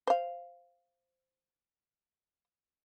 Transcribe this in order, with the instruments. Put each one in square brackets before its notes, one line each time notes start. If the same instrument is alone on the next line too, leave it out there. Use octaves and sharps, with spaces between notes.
[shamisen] C5 F5